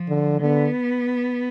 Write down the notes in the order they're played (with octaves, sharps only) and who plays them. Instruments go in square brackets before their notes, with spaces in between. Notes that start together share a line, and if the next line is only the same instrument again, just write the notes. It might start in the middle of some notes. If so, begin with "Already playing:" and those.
Already playing: [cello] F3
[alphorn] D3
[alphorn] D3 [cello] B3